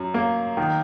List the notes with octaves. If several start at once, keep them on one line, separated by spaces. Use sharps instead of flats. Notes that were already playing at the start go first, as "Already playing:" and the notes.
Already playing: F#2
A#3
D#3